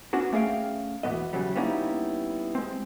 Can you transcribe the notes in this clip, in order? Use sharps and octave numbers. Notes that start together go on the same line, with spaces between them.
B3 C#4 D4 F#4
A3 C#4 G#4 F5 G5
E2 B2 D#3 F3 B3 D#5
E2 C#3 F#3 G3
G3 A#3 B3 C#4 D#4 E4
G#3 C4